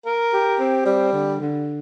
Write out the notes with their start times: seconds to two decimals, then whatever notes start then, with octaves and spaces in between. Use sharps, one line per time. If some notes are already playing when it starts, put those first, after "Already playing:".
0.06 A#4
0.33 G4
0.60 C4
0.86 G3
1.13 D3
1.40 D3